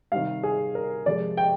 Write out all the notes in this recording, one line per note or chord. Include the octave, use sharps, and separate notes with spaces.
C3 D#3 G3 F5
G#4
A#4
C3 F3 G#3 D5
G5